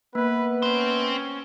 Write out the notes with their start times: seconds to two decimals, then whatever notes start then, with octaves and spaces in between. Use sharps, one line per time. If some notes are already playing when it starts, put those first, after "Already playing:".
0.15 A#3 B3 B4
0.62 C4 C#4 C5